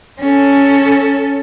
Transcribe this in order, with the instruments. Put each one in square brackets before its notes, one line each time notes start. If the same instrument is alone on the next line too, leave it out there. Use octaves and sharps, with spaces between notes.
[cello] C#4 A4